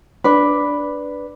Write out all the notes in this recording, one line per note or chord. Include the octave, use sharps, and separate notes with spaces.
D4 B4